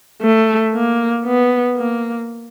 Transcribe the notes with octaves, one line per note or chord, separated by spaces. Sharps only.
A3
A#3
B3
A#3